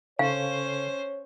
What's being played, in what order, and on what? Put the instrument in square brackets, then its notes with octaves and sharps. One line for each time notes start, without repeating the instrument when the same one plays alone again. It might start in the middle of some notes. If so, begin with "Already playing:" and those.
[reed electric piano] C#3 A4 C#6 [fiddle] C#4 C5 [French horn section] C#5 [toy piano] F5